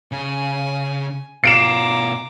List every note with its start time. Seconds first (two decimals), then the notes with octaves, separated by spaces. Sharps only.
0.12 C#3 G#5
1.44 B2 F4 A#5 D6 C7 D7 E7